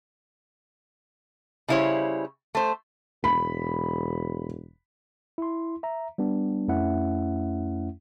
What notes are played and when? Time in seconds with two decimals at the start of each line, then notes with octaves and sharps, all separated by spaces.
1.68 C#3 G3 E4 C5 C#5
2.55 A3 C5
3.24 E1 B5
5.38 E4 C6
5.83 E5 A#5
6.18 G3 B3 D4
6.68 F2 A3 C#4 E4 E5 F#5